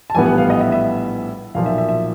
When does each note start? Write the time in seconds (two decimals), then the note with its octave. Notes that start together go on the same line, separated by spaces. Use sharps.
0.10 A5
0.15 A#1 A2 E3 G3 B3 G#5
0.26 F#5
0.38 F5
0.50 D#5
0.61 E5
0.72 E5
1.54 B1 A#2 F3 F5
1.66 E5
1.78 E5
1.89 E5